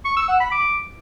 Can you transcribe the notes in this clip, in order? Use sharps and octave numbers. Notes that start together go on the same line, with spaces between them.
C#6
E6
F#5
B5
D6